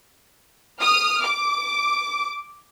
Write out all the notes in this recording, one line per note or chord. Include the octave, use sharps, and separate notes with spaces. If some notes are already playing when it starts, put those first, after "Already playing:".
D#6 F6
D6